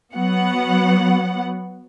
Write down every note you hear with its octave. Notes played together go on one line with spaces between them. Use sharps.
F#3 B3 F#5